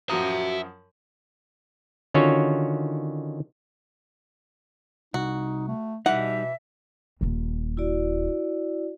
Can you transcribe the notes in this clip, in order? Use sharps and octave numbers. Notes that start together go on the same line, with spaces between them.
F#2 F3 F#4 E5 A#5 D#6
D3 D#3 C#4 F4 F#4 C#5
C2 D#4 F#4
A3
B2 E3 G3 D#4 E5 F#5
D#1 D#2
E4 F#4 D5